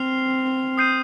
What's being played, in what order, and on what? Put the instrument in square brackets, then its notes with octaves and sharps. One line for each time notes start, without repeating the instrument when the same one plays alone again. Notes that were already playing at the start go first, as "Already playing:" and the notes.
Already playing: [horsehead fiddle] C4 [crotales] F6 C7 F7
[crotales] D#6 G6 C7 D#7